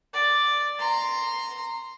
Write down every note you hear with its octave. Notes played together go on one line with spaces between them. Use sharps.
D5
A#5 C6